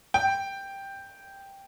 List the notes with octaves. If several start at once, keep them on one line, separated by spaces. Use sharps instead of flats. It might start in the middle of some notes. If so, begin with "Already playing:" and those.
G5